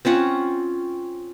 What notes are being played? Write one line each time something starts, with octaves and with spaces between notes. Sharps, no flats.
C4 C#4 F4 F#5